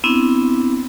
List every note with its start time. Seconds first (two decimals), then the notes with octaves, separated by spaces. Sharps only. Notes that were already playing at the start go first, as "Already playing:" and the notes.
0.04 B3 C4 D4 E4